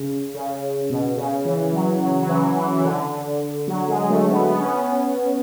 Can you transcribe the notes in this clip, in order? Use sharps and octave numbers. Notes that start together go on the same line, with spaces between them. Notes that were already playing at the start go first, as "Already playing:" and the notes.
Already playing: C#3
C#3
B2
C#3
E3
F#3
F#3
F#3
E3
E3
E3
D3
F#3
G#3
A3
B3
B3
C#4
B3